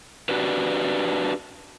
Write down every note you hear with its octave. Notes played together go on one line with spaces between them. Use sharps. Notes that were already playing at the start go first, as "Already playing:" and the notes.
D4 F#4 G4 B4